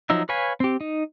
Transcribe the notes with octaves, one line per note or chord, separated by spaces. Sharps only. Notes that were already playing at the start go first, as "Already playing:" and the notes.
F3 F#3 D#4 E5
B4 C#5 F5 G#5 B5
C4 G4
D#4